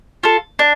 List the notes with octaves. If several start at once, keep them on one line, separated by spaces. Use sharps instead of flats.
F4 A4
D4